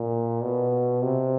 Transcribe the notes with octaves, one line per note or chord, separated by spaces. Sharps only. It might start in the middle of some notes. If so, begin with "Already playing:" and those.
Already playing: A#2
B2
C3